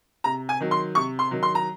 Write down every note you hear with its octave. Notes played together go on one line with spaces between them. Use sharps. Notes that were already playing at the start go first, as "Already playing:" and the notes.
C3 A#5
G#5
D#3 F#3
C6
C3 C#6
C6
D#3 F#3
C6
A#5